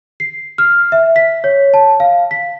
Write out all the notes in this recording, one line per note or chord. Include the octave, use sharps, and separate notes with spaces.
C7
F6
E5
B6
C#5
A5
F5
B6